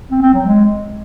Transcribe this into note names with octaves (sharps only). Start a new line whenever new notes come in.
C4
C4
F#3
G#3